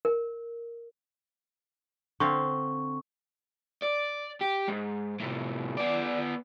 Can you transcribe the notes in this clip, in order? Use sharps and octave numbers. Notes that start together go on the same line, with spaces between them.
A#4
D3 C4 F5 C#6
D5
G4
G#2
A2 C3
B3 D5